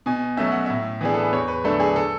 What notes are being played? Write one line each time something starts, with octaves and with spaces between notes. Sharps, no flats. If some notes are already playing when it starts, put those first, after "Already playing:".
B2 G#5
F#3 A3 C#4 E5
F#5
A2 E5
E3 B3 D4 G#4
A4
B4
E2 C#5
B4
D3 F#3 A3 D4 A4
G#4
A4